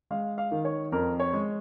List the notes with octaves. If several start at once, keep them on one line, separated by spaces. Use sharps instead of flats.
G#3 F5
F5
D#3
C#5
F2 A#4
C#5
G#3